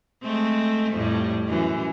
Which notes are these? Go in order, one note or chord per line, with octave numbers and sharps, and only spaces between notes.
G#3 A3 C4
F2 A2 G3
F#2 E3